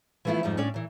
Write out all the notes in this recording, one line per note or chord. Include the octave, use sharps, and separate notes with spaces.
E3 F3 A3 B3 E4 F4
F2 G#2 F3 G3 D#4
A2 C#4 D4 D5
A#2 E3